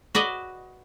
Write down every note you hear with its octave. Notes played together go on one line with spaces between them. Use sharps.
F#4 B4 D5 D#5